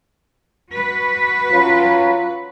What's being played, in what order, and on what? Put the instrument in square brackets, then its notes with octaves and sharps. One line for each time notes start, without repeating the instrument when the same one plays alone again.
[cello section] F#4 B4
[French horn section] F#3 C#4 F4